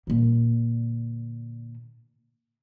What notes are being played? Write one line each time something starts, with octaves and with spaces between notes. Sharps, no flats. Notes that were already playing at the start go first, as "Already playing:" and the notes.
A#2 D3